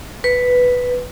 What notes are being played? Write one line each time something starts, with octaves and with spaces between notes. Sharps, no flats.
B4